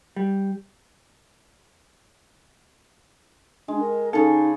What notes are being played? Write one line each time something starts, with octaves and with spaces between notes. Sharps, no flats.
G3
G#3 D4
A#4
C#3 D#4 G#4 A4